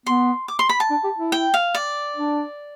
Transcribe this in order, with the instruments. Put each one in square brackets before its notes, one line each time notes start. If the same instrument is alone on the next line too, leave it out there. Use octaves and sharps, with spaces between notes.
[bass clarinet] B3 [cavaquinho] C6
[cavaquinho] D6
C6
B5
A5
[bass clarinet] D4
G4
E4
[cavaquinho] G5
F5
D5
[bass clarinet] D4